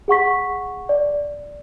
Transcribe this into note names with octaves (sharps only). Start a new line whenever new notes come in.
G#4 F#5 C#6 B6
D5